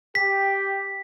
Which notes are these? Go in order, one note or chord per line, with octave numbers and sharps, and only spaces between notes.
G4 B6